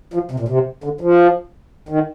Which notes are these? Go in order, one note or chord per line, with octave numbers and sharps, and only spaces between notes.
F3
C3
A#2
C3
D3
F3
D#3